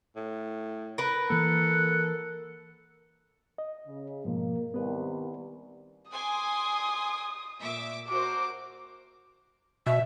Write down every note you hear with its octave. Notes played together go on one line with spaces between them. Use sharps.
A2
A#4 B4
E3 A#3 A4 F#5
D#5
C#3
G#2 B2 F3 A#3
C2 D#3 G3 B3 B4
G#5 C6 D6 D#6
A#2 E5 D6
F#4 A#4 C5 D6
B2 E5